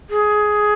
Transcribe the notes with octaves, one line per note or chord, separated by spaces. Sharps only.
G#4